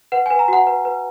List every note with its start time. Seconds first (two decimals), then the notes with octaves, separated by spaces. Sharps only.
0.12 B4 F#5
0.26 B4 G#5
0.39 A#5
0.48 F#4 F#5
0.67 B4
0.85 B4